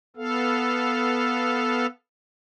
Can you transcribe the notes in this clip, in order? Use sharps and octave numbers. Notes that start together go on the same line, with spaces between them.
B3 A4 F5